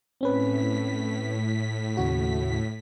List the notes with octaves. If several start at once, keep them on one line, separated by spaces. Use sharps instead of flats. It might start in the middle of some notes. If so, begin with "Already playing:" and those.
A2 C4 C#4 B4 B6
D#2 C#3 F#4